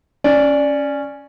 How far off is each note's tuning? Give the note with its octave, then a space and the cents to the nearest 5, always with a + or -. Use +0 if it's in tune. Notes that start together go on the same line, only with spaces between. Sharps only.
C#4 +0 D5 +0